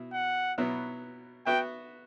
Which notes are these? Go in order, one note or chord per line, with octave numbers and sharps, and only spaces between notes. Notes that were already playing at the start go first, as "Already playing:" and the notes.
Already playing: B2 E4
F#5
B2 F#3 B3 E4
B3 F#4 B4 E5 G5